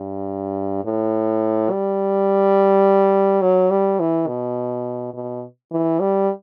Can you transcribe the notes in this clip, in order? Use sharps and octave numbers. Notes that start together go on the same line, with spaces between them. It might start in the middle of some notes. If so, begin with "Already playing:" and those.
Already playing: G2
A2
G3
F#3
G3
E3
B2
B2
E3
G3